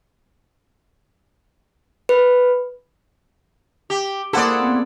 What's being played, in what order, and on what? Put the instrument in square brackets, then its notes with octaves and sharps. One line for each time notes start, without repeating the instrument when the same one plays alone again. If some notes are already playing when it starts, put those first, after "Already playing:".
[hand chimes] B4
[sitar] G4
[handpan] A#3 G#4 [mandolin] E4 C5 F#5 [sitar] A4 D5
[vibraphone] B3 C4